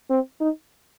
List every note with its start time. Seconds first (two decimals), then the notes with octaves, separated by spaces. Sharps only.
0.10 C4
0.41 D#4